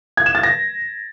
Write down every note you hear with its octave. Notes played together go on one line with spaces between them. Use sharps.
G#6
E7
A6
A#6